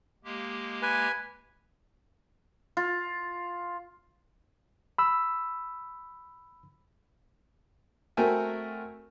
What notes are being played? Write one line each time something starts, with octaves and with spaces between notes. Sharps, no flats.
G#3 A#3 G4
B4 G#5
F4
B5 E6
A3 C4 F#4 A#4 G5 G#5